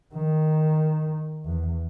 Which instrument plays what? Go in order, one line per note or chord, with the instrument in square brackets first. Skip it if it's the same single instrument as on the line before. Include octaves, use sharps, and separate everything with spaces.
[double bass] D#3
E2